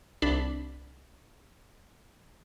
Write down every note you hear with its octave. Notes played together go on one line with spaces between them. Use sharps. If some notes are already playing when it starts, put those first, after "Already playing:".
C2 D4 B5